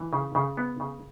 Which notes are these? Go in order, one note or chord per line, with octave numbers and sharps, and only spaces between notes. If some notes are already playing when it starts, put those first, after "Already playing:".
Already playing: E3
C#3
C#3
B3
C#3